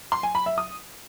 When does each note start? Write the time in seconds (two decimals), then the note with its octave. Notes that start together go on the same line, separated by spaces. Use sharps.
0.12 C6
0.23 G#5
0.35 B5
0.46 E5
0.58 D#6